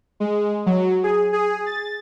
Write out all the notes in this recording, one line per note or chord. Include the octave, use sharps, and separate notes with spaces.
G#3
F#3
G#4
G#4
A6